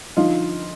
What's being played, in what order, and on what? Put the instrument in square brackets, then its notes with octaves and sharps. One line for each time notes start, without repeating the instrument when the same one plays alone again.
[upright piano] D3 F3 D#4 F4